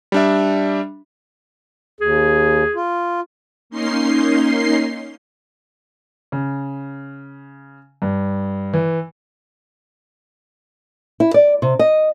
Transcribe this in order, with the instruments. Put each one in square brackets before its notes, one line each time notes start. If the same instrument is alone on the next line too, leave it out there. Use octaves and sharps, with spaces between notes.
[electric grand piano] G3 D4 E5
[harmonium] D#2 [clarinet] G#4
[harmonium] F4
[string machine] A#3 C#4 D#4 C6 C7
[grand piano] C#3
G2
E3
[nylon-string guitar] E4
D5
C3
D#5